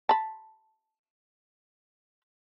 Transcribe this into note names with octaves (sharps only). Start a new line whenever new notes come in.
A5 B5